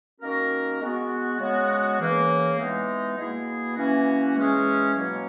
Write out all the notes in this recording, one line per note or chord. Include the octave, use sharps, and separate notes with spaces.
D#3 A#3 C#4 F#4 A#4
G#3 B3 F#4
C#3 G#3 B3 F#4
C#3 E3 A#3
E3 G#3 B3 D#4
B2 A#3 E4 G#4
E3 A#3 C#4 F#4
E3 G#3 C#4 G#4
B2 F#3 A#3 C#4